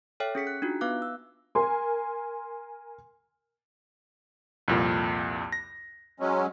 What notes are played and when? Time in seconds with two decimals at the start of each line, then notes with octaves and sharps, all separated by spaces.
0.20 A4 C#5 E5 G5 F6
0.35 C#4 G#4 B6 C#7
0.47 F#6
0.62 D4 D#4 F4 F#4
0.81 B3 B4 F5 D6 F#6
1.02 E6
1.55 A#4 G#5 C6
4.68 C2 F2 A#2
5.52 A#6
6.20 F#3 G#3 C#4